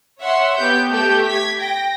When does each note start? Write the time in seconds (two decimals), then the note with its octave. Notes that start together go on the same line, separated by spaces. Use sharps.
0.20 C#5 E5 F#5 C6
0.58 B3 G4 G6
0.90 A3 G4 G6
1.25 G#6 B6
1.59 G5 A#6